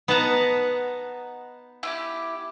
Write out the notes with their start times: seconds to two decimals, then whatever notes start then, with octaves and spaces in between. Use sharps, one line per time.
0.08 B3 D#4 F#5 A5 A#5
1.83 E4 F4 G4